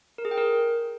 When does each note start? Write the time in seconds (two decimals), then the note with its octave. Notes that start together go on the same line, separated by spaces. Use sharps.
0.18 A#4
0.25 G#4
0.31 G5
0.38 A#4